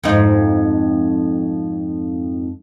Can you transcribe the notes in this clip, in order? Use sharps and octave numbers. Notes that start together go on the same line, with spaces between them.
F2 G#2 D#4